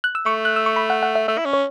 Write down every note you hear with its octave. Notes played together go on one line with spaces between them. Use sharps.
F#6
E6
A3 C#6
F#6
E6
C#6
B5
F#5
F#5
E5
A3 E5
E4
C#4
C#5